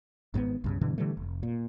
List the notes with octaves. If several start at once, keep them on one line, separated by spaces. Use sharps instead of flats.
G#1 G#2 D#3 B3
C2 G2 C#3
G2 B2 D3 E3
D3 E3 G3 A3
F1
A#2